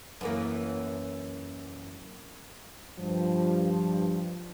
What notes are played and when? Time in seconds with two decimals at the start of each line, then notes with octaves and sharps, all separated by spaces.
0.21 F#2 E3 A#3
2.99 G2 F3